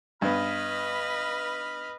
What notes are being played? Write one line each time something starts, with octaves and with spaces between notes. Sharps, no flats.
G2 B3 B4 D#5 B5 F6